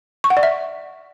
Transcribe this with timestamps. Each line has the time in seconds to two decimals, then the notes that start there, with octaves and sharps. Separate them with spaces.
0.24 C#6
0.30 F#5
0.37 D5
0.43 E5